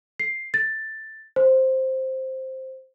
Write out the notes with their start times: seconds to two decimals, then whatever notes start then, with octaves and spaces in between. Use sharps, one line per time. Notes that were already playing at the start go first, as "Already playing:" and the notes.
0.20 C7
0.54 A6
1.36 C5